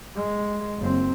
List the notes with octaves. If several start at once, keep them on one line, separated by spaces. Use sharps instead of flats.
G#3
F#1 C4